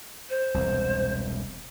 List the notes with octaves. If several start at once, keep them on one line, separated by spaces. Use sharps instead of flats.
C5
E1 C2